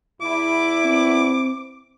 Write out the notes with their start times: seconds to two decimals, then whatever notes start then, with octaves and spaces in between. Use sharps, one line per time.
0.21 E2 E4 D6
0.85 C4